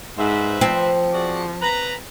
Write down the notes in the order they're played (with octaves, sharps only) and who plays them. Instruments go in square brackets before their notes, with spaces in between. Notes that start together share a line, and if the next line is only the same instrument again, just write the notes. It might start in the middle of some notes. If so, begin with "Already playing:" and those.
[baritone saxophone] G#2 [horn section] B4 C5 E5
[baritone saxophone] F3 [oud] C4
[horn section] F#4 G#4 D5
B4 A#5